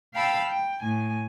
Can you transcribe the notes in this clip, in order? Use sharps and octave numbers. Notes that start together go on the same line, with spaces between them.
F5 G5 A5 B5 E6
G5
A2 G#5